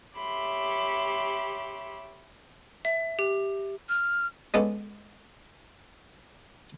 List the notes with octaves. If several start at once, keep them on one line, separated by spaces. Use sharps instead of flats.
G4 C#5 E5 B5 C6 D6
E5
G4
F6
G#3 B3 C#4 D4 A4